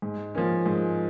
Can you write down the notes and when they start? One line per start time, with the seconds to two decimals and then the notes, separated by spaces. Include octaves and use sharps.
0.02 G#2
0.35 F3 A#3 C#4
0.66 G#2